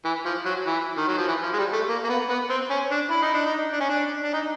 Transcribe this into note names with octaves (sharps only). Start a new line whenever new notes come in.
E3
F3
F#3
E3
D#3
F#3
F3
E3
F3
G#3
G3
A3
A#3
A#3
B3
B3
C4
C#4
D4
E4
D#4
D4
D#4
D4
C#4
D4
D4
D#4